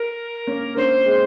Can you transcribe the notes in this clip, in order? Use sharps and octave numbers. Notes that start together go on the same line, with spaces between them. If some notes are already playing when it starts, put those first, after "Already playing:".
Already playing: A#4
A#3 C#4
A#3 C#4 C5
G#3 C4